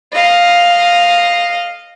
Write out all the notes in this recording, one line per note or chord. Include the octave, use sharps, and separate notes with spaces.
D#5 F5